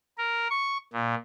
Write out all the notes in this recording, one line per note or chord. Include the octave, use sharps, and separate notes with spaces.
A#4
C#6
A#2